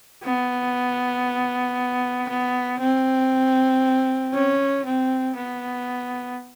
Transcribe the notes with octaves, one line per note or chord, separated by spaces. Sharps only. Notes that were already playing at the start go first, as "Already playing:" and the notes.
B3
B3
C4
C#4
C4
B3